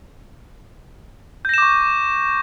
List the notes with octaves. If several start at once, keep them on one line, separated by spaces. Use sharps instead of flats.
C#6 D6 G6 A#6 E7